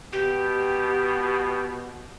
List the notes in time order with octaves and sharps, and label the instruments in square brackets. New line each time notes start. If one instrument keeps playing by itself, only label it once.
[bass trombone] B2 [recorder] G4